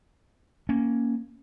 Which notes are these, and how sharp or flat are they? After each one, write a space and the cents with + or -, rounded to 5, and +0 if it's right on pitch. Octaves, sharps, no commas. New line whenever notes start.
A#3 +0 C#4 +0